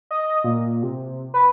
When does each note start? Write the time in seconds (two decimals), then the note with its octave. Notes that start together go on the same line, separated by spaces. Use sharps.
0.11 D#5
0.44 A#2
0.83 C3
1.34 B4